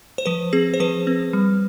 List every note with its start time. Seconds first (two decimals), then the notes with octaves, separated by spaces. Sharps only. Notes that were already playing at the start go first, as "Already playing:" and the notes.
0.18 C5
0.26 F3 B4
0.53 C4 G#4
0.74 C5
0.80 F3 B4
1.07 C4
1.33 G3